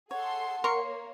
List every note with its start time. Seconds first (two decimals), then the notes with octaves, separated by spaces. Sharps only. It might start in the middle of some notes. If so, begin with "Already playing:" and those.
0.11 G#4 A4 C#5 F#5 C6
0.64 A#3 A#4 C#5 C6 C#6